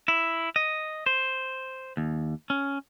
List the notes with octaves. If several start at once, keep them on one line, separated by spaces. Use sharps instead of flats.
E4
D#5
C5
D#2
C#4